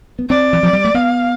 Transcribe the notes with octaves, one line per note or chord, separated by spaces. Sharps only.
B3
C4 D5
E3
F3
G3
A3
B3 F5